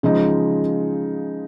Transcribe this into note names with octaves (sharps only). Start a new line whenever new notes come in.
C#3 F3 G#3 D#4